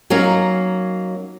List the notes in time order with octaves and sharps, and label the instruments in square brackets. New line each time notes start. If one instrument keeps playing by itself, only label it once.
[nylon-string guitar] F#3 A#3 C#4 D#4 F5